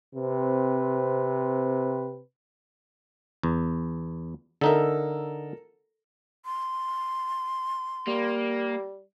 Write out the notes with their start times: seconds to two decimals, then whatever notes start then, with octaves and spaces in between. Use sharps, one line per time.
0.15 C3 C4 B4
3.43 E2
4.61 D3 D#4 A4 A#4 E5
6.45 C6
8.07 G3 A#3